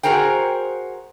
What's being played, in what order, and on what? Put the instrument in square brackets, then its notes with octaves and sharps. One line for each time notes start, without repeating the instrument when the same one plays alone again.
[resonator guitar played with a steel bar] F#4 G#4 A#4 C5 G5